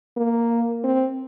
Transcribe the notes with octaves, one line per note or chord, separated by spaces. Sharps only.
A#3
C4